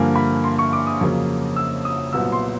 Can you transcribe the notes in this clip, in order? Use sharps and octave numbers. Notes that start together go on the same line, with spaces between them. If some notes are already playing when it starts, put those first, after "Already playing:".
Already playing: G2 D3 F3 A#3 G#5
B5
C6
C#6
D6
D#6
F2 C#3 F#3 A#3
E6
D#6
C2 A#2 F#3 B3 E6
C6